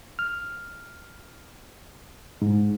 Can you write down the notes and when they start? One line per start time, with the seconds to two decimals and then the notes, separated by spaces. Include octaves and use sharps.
0.19 F6
2.42 G#2